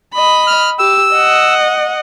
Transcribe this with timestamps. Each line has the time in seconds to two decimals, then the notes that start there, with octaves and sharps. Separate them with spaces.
0.14 D#5 B5
0.47 F6
0.79 G4 E6
1.14 D#5 F#5